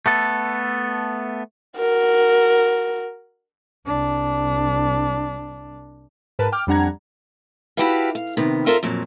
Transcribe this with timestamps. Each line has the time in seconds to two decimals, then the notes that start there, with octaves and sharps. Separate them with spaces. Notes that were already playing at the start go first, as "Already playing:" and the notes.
0.06 A3 B3 A4
1.78 F#4 A#4
3.86 C2 D4
6.39 G#2 A#4 B4 A5
6.52 G5 D6 F6
6.67 F2 G3 D4 F#5 A#5 G#6
7.77 E4 F#4 G4 A4 B4 F5
8.15 F5
8.37 C3 D#3 B3
8.66 F4 A4 A#4 C5 E5 F5
8.83 F2 A#2 F#3